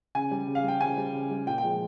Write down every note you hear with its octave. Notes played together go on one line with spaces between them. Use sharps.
C#3 G#5
G3
C#3
F5
G3 G5
C#3 G#5
G3
C#3
G3
A#2 G5
G5
F3 G#3